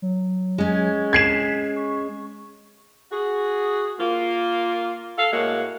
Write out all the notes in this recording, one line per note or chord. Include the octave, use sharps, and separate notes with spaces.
F#3
G#3 C#4
G#6 B6 C7 E7
C#6
F#4 G#4
A#3 F4
A4 F5
A2 G#3 A#3 F#4